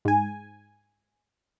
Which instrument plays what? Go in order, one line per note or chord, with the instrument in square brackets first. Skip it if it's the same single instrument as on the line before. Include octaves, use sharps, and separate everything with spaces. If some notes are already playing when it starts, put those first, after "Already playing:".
[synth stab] G#2 G#5